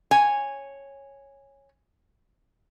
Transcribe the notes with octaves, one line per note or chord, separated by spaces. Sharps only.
C#5 G#5